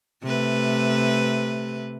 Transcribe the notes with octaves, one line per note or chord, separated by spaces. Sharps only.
C3 A3 B4